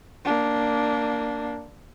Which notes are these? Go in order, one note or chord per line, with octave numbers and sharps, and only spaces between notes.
A#3 D4